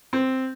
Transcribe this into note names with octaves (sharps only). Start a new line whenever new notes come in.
C4